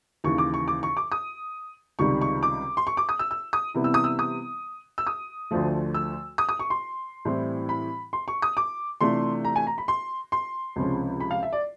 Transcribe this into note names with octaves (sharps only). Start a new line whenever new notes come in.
D#2 C#3 E3 C#6
D6
C#6
D6
C#6
D6
D#6
C#2 C3 D#3 G3 C#6
C#6
D6
C6
C#6
D6
D#6
E6
E6
D#6
C3 E3 G3 B3 E4
E6
D#6
E6
D#6
E6
D#6
D2 D3 F3 A3
E6
D#6
D#6
C#6
C6
A2 E3 G3 C4 E4
B5
C6
C#6
D#6
D6
C3 E3 A3 D4 F4 C6
A#5
G#5
A#5
B5
C6
C6
C#2 C3 F3 G#3 C#4
B5
F5
E5
D5